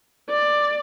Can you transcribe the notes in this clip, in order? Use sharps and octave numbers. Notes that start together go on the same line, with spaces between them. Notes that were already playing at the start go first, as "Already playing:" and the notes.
D5